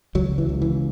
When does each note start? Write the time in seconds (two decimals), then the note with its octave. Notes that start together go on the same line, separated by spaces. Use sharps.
0.15 C#2 F#3
0.38 E3
0.49 C#2
0.62 E3